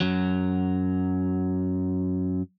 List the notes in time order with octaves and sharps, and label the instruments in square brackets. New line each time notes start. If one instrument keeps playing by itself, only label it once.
[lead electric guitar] F#2 F#3